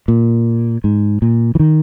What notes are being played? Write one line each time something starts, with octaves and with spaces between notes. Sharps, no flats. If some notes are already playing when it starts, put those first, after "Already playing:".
A#2
G#2
A#2
E3
D#3